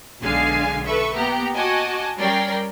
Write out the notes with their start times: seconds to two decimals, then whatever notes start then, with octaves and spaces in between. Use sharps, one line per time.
0.21 B1 D3 G#3 F5 G#5 C7
0.86 A4 B4 E5 C#6
1.16 A#3 B3 G4 A#5
1.55 F#4 D#5 G#5 A5 D6
2.17 G3 C#4 A#4 D5 G5 C7